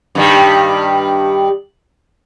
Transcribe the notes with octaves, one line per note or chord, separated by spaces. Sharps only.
G2 D#3 G3